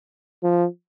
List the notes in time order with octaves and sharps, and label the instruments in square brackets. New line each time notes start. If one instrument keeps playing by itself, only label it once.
[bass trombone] F3